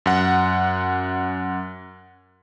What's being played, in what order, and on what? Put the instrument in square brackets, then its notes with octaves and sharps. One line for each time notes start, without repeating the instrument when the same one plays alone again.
[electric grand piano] F#2 F#5